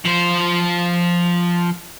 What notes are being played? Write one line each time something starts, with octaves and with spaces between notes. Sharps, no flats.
F3 C5